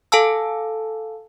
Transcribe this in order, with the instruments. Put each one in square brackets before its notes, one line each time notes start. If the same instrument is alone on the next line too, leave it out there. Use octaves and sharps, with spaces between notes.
[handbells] A4 F5 G#5 A5 E6